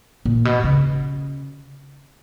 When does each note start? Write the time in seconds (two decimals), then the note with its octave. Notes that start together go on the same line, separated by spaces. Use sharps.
0.25 A#2
0.45 B2
0.64 C#3